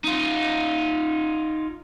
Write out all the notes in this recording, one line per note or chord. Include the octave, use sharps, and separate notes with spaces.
D#4 F4